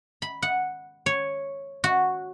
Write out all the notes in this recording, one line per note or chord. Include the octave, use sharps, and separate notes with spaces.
B5
F#5
C#5
F#4